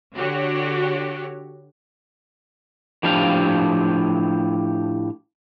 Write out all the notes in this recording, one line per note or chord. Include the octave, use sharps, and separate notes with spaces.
D3 F#4 G4 C#5
A2 F3 D4 G4 F5